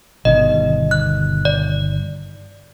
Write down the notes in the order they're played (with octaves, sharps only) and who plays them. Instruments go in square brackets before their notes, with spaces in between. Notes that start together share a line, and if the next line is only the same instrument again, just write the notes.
[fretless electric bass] G1 B2 D#3 [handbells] D#5
[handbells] F#6
D5